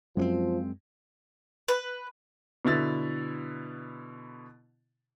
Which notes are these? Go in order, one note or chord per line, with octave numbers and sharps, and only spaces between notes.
F#2 F3 G#3 A#3 C4
B4
B2 D3 E4 A6